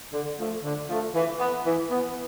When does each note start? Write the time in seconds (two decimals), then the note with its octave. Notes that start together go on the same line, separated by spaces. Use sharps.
0.13 D3
0.39 F3 A3
0.64 D3
0.89 F3 A3
1.15 E3
1.40 B3
1.65 E3
1.90 B3